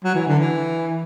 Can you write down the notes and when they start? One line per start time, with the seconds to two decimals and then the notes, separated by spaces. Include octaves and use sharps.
0.04 F#3
0.15 E3
0.27 D3
0.39 E3